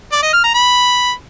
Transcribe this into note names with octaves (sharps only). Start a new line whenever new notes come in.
D5
D#5
F6
A#5
B5